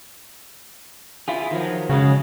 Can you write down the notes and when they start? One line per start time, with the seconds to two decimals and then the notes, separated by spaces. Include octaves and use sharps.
1.28 E4 F4 G#4
1.51 D#3 F3 F#3
1.90 C#3 F#3 G#3